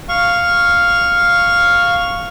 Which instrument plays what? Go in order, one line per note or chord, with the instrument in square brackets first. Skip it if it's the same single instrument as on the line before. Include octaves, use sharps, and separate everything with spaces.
[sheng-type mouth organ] F5 C#6